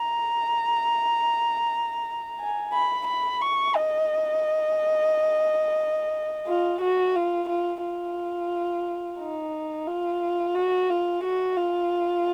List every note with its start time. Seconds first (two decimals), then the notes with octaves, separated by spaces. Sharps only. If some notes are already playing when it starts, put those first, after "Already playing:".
Already playing: A#5
2.39 G#5
2.73 B5
3.07 B5
3.41 C#6
3.76 D#5
6.47 F4
6.81 F#4
7.15 F4
7.49 F4
7.83 F4
9.19 D#4
9.87 F4
10.55 F#4
10.90 F4
11.24 F#4
11.57 F4